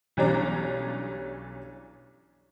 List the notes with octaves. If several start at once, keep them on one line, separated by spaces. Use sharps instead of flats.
B1 E3 G3 C#4 D4 A#5